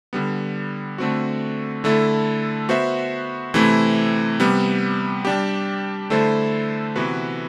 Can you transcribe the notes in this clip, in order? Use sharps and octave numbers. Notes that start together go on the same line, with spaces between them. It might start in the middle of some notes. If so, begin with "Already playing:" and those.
D3 G3 B3
D3 A3 C4 F#4
D3 A3 E4 A4
B3 F#4 C5 E5
C3 E3 A3 C4 E4
C3 G3 B3
G3 D4 G4
D3 A3 E4 A4 C5
C3 E3 B3 F#4 B4